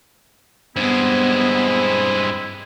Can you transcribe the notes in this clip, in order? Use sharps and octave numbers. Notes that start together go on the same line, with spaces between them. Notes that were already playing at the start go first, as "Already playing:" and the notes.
G2 G#3 B3 C4 E4